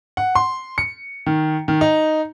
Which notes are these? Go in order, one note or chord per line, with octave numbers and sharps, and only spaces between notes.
F#5
C6
C#7
D#3
D#3
D#4